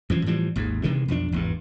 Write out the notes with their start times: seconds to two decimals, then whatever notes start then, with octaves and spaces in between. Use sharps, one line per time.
0.10 F#2 E3 F3
0.26 A2 E3 F3 G3
0.56 G#1 D#2 G#2
0.83 C3 D#3 E3 G#3
1.08 B1 F2 E3 D4
1.32 G#1 E2 G2